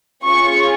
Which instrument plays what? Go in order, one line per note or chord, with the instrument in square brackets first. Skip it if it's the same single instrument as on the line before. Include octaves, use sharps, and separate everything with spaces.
[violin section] C#4 F4 G#4 C#6